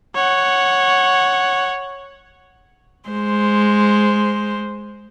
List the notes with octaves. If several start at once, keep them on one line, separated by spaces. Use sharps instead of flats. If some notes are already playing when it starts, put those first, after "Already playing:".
C#5 F#5
G#3 C5